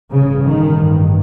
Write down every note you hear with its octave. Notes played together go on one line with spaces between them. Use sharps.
A1 G2 C#3
D#3